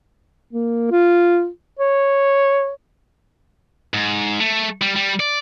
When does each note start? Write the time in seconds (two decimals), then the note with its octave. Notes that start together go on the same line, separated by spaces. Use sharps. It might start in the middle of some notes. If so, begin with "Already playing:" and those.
0.53 A#3
0.91 F4
1.79 C#5
3.94 G#2
4.40 A3
4.82 G3
4.96 G3
5.20 D5